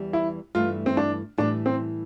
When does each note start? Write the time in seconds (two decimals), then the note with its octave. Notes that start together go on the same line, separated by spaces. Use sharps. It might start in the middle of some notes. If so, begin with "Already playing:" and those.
Already playing: E2 E3 G3
0.13 E4
0.55 G2 E3 A3 F4
0.86 C4
0.97 D4
1.38 A2 E3 G3 D4
1.66 C4